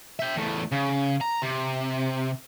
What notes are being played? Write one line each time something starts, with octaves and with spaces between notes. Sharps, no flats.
E5 G5
E2 A3
C#3
A#5
C3